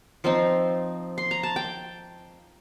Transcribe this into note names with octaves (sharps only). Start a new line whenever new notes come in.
F3 C4 D#4 C6
C6
A#5
A5
G5